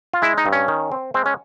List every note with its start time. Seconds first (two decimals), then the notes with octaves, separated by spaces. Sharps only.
0.13 F4
0.22 G#3 E4
0.38 D#4
0.46 G2
0.52 C#4
0.68 D#3
0.92 C4
1.14 G#3 C4
1.26 C#4